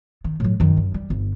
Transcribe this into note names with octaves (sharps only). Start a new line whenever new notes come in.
D#3
A2 F#3
F#2 D#3
F#2
G3
G1